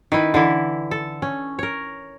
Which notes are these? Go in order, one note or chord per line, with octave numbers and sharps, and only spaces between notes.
D#3 E4 B4
D3 E3 E4
A4
C#4
A#4 C#5